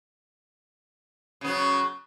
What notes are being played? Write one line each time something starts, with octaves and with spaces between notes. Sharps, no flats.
C#3 F#3 B3